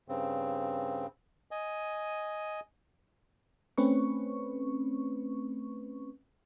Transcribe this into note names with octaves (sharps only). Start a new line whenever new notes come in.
G2 C#3 C4
D#5 G#5
A3 C4 C#4 B4 C#6